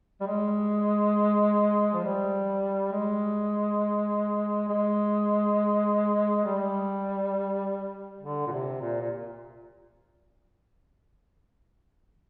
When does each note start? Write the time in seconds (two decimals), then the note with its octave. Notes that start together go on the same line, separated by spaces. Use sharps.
0.21 G3
0.27 G#3
1.93 F3
2.04 G3
2.92 G#3
4.69 G#3
6.45 G3
8.21 D3
8.47 A#2
8.52 C3
8.81 A#2
9.01 A#2